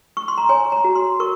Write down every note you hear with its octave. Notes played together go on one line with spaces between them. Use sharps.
C#6
C6
A#5
C#5 G#5
A#5
F#4
C6
A#4 C#6